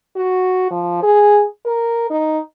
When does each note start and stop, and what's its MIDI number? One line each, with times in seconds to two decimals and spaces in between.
0.16 0.70 66
0.71 0.99 53
1.02 1.44 68
1.65 2.07 70
2.10 2.39 63